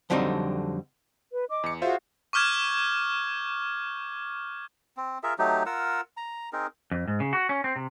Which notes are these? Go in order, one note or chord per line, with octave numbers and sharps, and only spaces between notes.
F2 D3 F#3 G3 C4 D#4
B4
D#5 D6
E2 C#7
F4 F#4 G#4 C5 E5 F5
C#6 D6 F6 G6 G#6
C4
F4 G#4 A#4 E5
F#3 A3 D#4 G4
F4 A#4 F#5 E6
A#5
C4 D#4 G#4 A#4
F2
G#2
C#3
F#4
C#4
C4
C3